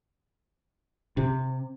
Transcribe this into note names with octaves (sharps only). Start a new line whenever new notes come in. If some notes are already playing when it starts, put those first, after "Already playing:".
C3